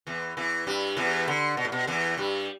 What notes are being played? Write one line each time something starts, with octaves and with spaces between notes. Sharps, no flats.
E2 E3
E2 E3
G2 G3
E2 E3
D3
B2
A2
B2
E2 E3
G2 G3